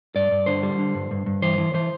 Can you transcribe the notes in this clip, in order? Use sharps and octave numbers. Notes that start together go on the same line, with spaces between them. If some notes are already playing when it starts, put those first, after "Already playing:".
G2 D5
G2
D3 C5
G3
D3
G2
G2
G2
E3 C5
E3
E3 C5